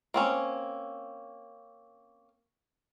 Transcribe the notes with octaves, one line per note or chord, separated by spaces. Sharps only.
A#3 C4 C#4